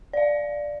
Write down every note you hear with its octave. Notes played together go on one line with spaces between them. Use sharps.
D5 F5